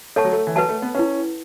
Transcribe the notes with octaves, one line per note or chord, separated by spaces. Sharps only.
A3 A4 C#5 F#5 A5 C#6
F#3
A3
E3
F#3 B4 F#5 A5
A3
B3
C#4 E4 B4 F#5